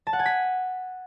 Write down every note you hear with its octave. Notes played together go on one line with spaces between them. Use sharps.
A5
F#5
G#5
B6